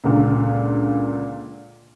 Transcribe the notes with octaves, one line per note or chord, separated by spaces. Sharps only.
C#2 A#2 D3